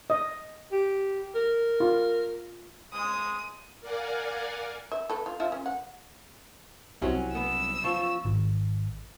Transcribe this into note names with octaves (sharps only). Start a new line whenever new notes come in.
D#5
G4
A#4
F4
G#3 D#6
A#4 D5 F5 F#5 G#5
E5
A4 B4
F4
F3 F4 E5
C#4
F#5
C2 F#3 C#4 F#4
B3 E6
F3 C#6
G#1